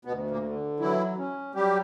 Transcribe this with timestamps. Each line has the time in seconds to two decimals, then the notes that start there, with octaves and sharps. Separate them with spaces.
0.05 D2 B2 B3
0.30 A#2 A#3
0.43 D3
0.80 E3 F#3 E4
1.18 C#4
1.55 F#3 G3 G4